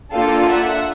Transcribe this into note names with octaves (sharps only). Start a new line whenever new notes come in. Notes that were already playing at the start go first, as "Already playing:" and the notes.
A#3 D4 F4 A4 F5 G5
E5 F#5